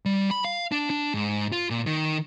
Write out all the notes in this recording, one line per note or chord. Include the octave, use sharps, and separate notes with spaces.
G3
B5
F5
D4
D4
G#2
F4
A#2
D#3